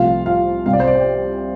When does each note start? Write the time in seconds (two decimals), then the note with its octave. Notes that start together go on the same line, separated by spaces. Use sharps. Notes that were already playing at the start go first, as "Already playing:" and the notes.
Already playing: C2 C3 F3 A3 F4 F5
0.26 F4 F5
0.66 C2 C3 G3 F5
0.73 D5
0.80 C5
0.87 D5